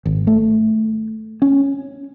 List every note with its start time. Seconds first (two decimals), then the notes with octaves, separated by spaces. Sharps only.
0.05 G#1
0.27 A3
1.42 C#4